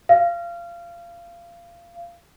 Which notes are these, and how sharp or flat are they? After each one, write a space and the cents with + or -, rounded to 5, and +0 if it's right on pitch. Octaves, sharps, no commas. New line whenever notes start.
F5 -25